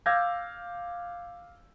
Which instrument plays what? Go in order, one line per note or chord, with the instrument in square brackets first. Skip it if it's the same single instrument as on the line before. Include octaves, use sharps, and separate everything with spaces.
[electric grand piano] F5 D6 E6 G6 G#6 A#6